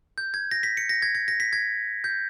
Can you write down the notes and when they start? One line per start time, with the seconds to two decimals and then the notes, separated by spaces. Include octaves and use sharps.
0.18 G6
0.34 G#6
0.51 A#6
0.63 B6
0.77 C#7
0.89 A#6
1.02 G#6
1.15 G#6
1.28 A#6
1.40 B6
1.53 G#6
2.04 G6